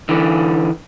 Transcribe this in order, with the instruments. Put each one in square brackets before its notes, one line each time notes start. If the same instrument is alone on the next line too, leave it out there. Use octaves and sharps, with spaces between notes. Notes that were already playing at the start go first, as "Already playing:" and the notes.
[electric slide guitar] D3 E3